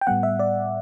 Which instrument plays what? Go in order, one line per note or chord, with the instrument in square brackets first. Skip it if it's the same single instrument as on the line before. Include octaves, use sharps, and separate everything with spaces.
[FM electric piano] G5
A2 G3 B3 F#5
E5
D5